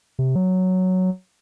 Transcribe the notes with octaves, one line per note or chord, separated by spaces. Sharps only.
C3
F#3